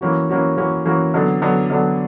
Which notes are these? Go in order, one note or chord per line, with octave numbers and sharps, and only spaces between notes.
E3 A#3 C#4 F#4
E3 A#3 C#4 F#4
E3 A#3 C#4 F#4
E3 A#3 C#4 F#4
D3 F#3 B3 D4
D3 F#3 B3 D4
D3 F#3 B3 D4